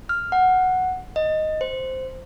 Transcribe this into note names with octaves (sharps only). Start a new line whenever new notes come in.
F6
F#5
D#5
C5